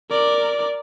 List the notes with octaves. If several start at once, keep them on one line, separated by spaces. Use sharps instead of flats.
A#4 D5